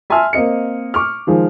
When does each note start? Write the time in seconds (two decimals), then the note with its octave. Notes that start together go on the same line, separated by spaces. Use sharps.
0.10 E5 G#5 A5 C6 E6 F6
0.33 A#3 C4 D#5 C#7
0.94 C#6 D6 F6
1.27 D#3 F3 G#3